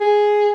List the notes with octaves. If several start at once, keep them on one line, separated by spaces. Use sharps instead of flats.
G#4